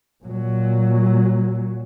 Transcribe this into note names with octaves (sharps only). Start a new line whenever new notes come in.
A#2 F#3